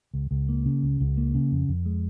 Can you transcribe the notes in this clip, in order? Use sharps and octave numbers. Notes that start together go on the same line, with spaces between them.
C#2
C#2
A#3
C#3
C#2
C#2
A#3
C#3
F2
F2
G#3